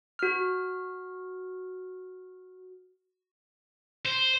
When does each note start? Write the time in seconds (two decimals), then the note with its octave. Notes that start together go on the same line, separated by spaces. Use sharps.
0.19 F#4 F6
4.05 C5